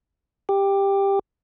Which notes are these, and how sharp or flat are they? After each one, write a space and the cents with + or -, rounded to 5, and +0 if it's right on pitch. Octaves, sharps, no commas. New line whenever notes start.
G4 +10